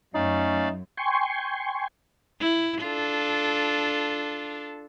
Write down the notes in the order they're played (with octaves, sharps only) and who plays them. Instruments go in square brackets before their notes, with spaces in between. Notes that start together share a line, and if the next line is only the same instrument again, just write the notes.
[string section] F#2 [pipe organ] A3 D5 F5 [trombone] C#4 [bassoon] D#4
[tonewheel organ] G5 G#5 C6 C#6
[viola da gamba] E4
D4 F4 A4